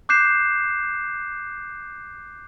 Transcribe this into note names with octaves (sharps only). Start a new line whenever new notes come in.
D6 F#6 G6 C7 E7